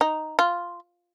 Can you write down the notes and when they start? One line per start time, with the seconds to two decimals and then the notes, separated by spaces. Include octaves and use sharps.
0.01 D#4
0.39 F4